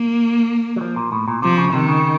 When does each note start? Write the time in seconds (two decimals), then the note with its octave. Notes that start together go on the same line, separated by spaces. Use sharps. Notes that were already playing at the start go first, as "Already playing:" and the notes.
Already playing: A#3
0.76 F#3
0.81 F3
0.96 A#2
1.12 A2
1.28 A#2
1.42 C3 F3
1.58 C#3
1.73 C3 D#3
1.88 C#3